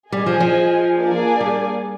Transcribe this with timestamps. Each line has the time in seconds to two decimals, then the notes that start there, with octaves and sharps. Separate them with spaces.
0.11 G3 G#4 D#5 G#5
0.26 F3
0.40 F3
0.97 A#3 D4 G#4 D5 G#5
1.41 G3